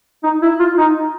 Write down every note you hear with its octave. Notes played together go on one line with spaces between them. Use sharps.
D#4
E4
F4
D#4